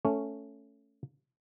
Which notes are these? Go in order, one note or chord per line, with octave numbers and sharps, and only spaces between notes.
A3 C#4